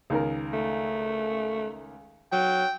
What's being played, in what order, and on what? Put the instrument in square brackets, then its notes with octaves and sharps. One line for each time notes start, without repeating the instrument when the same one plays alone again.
[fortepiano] C#2 D#3 A#4
[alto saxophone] A3
[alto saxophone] F#3 [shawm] G5